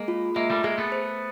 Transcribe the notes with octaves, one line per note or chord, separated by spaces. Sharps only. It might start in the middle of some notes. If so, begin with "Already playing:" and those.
Already playing: G#3 A#3 G#4
F4
G#3 A#3 E5
G3 A3
G#3 A#3 G#4
A3 B3
C5